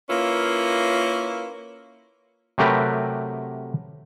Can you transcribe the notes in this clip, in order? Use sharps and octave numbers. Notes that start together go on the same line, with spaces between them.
A#3 C#4 E4 F4 B4
C3 F#3 A3 G4 A#4 B4